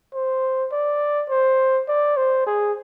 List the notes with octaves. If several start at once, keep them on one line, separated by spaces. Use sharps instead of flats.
C5
D5
C5
D5
C5
G#4